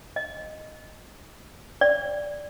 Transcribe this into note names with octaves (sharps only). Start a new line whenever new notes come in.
D#5
D5